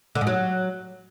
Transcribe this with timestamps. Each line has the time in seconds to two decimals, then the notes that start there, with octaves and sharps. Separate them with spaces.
0.15 D3
0.21 G#2
0.27 F#3